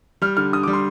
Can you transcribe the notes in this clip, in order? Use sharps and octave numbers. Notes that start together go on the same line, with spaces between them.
G3 F6
D3 F6
D3 D#6
D6
G3
C6